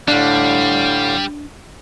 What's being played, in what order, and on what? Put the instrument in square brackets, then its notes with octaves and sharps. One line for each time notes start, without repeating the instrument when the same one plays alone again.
[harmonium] A2 D3 F5 [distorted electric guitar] G3 [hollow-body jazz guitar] D4